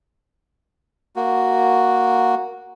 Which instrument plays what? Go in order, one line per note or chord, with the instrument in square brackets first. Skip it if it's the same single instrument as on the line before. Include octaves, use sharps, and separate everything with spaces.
[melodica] A#3 F#4